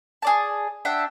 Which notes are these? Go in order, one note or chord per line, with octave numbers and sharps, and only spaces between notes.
G#4 D5 A5
D4 E5 F#5 G5